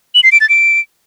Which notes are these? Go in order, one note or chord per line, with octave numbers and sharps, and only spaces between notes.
F#7
C7
D7
A6
D7